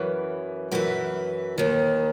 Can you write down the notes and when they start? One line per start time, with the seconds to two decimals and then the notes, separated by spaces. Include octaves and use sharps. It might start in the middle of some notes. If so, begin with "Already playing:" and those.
Already playing: F#2 E3 B4
0.72 F#2 E3 B4
1.58 D#2 D#3